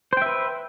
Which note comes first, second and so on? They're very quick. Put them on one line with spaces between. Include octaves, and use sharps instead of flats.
C5 G5 E5 B4